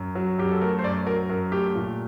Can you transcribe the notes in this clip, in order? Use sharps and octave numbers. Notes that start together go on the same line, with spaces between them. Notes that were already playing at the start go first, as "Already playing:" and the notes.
Already playing: F#2
F#3
F#2 G4
A4
A3 A#4
C5
F#2 D5
F#3 A#4
F#2 A#4
A3 G4
A#2